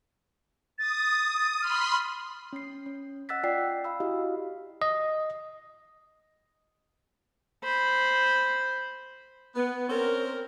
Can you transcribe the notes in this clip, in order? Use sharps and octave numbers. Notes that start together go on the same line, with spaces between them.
D#6 A6
B5 C6 F6
C#4 C7
C#4
D#5 F#5 E6 F#6 A6 B6
F4 D5 G5 C7
F5 B5 E6
E4 F#4 G4 D#5 F5
D#5
C5 B5
B3
C4 C#4 A#4